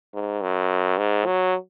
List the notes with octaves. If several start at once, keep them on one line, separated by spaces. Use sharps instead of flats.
G#2
F#2
G#2
F#3